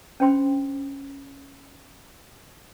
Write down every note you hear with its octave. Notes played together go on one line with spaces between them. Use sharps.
C#4 D4 C5 G5 B5 C6